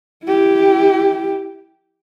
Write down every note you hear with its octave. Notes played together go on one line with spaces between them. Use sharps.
E4 G4